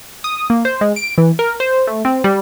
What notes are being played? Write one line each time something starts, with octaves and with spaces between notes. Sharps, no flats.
D#6
A#3
C5
G#3
D7
E3
A#4
C5
A3
C4
G3